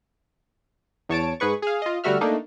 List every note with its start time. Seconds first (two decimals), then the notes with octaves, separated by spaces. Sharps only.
1.09 E2 C#5 A5 D7
1.40 G#2 G#4 B4 C#6
1.62 G#4 F5
1.82 F4 D#5
2.04 D3 G3 A3 F#4 E5 F6
2.21 A3 A#3 D4 D#4